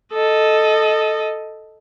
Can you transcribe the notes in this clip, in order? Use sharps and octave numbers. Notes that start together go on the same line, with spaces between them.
A4 D#5